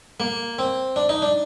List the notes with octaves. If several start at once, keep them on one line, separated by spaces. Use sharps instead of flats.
A#3
C4
D4
D#4
D4